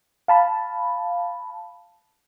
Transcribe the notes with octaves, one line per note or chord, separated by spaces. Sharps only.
F5 A5 B5